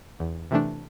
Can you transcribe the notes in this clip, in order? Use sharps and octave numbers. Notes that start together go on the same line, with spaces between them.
E2
C3 E3 A3 D4